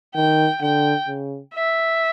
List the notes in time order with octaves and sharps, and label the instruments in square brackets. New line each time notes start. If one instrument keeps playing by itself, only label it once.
[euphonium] D#3 [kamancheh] G5
[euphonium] D3 [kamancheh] G5
[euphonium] C#3
[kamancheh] E5